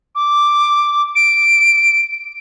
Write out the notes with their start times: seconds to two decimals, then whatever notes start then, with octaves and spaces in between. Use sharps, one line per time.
0.15 D6
1.16 D7